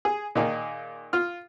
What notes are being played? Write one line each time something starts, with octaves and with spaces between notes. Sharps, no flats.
G#4
A#2 D#3 D#4 G#4
F4 F6